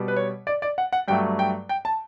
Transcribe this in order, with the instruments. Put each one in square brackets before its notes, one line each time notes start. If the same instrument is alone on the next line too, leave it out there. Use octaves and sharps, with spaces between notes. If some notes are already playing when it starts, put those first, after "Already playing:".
Already playing: [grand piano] B2 G3
B4
C#5
D5
D5
F#5
F#5
G2 F#3 A3 G5
G5
G5
A5